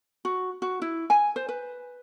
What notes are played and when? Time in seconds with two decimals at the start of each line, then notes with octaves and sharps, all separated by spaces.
0.25 F#4
0.62 F#4
0.82 E4
1.10 G#5
1.36 C5
1.49 B4